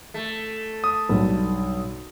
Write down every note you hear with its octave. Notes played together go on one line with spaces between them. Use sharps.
A3
D#6
B1 G2